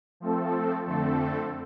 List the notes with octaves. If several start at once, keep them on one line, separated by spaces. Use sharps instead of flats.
F3 A3 C4 A4
F2 D3 A3 C4 A4